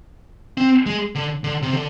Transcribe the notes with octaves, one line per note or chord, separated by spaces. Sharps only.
C4
G#3
D3
D3
C3
D3